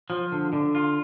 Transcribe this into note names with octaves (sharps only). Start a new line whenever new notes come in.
F3
D3
D3
F4